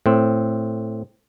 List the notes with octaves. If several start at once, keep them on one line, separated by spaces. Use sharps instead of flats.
A2 C4